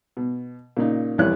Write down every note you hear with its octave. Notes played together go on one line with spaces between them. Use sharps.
B2
A#2 C#3 D#4
C2 F2 E3 E4 C#5 F#6